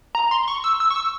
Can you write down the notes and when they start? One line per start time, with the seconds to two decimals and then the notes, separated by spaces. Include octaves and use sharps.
0.15 A#5
0.31 C6
0.48 C#6
0.64 E6
0.80 E6
0.91 C#6
0.96 E6